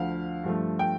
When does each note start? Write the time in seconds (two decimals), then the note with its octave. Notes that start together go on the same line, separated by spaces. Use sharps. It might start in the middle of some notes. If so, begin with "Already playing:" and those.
Already playing: D2 D3 F3 F5
0.44 G2 F3 A3
0.79 G5